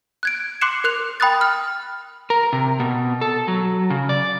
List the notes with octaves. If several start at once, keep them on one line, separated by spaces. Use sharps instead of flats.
F#6 G#6 D7
C6 D6 F#6 C7 C#7 E7
A#4 F#6 F7
G5 B5 D#6 F#6 A6
F6
A#4
C3
B2
A4
F#3
C#3
D5